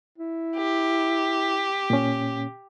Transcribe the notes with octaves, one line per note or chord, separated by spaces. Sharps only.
E4
G4
A#2 C#4